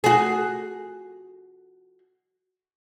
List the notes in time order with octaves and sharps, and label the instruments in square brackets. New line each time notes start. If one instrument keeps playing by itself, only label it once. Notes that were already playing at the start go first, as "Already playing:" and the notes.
[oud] F#4 G#4